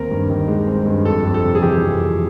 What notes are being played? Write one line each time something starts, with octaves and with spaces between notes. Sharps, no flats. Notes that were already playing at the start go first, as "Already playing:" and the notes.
Already playing: D#2 C4 A#4
G2
D#3
G#3
C4
G2
F2 A4
F2
A4
C3
G#4
E3 G4
F2
F2